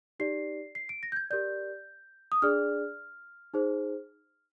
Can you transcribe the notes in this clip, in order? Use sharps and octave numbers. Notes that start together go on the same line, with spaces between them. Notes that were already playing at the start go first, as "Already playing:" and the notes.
D#4 G4 D5 C7
C7
D7
A#6
G6
G#6
G4 A#4 D5 G6
D#6
D4 G#4 D5 F6
D#4 G#4 C5